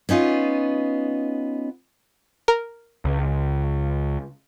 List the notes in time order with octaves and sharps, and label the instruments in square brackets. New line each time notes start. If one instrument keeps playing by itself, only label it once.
[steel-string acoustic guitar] B3 C#4 D#4 F4
[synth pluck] A#4
[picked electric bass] C#2